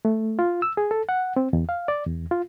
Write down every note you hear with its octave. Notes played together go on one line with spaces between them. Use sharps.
A3
F4
E6
G#4
A4
F#5
C4
E2
F5
D5
E2
F4